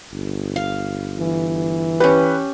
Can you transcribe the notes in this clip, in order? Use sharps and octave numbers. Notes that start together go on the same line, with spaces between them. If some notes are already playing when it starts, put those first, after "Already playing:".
G1
F5
E3
C#4 G4 B4